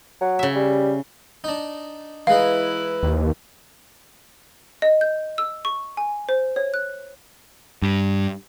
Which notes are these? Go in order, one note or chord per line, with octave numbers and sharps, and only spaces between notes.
F#3
C#3 E5
G3
D4 D#4
E3 G#3 D#4 E4 B4 F5
D#2
D#5
G6
E6
C#6
G#5
C5
C#5
F#6
G2